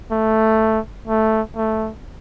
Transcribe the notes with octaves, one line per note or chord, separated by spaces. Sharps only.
A3
A3
A3